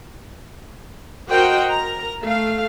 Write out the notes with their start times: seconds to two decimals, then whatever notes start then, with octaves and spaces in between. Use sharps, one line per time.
1.30 F#4 A#4 C5 D#5 F#5 G5
1.72 A#4 A#5
2.21 A3 F5